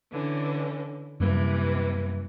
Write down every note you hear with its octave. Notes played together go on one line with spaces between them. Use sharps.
D3 E3 C#4
F#2 C3 E3 G3 A#3